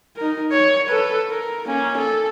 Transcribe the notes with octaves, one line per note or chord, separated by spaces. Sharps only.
D#4 A#4
C#5
A4 B4
A#4
A#3 C#4
A4